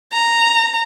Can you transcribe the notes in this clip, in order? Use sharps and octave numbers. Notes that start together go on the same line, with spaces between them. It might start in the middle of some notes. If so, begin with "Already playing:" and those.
A#5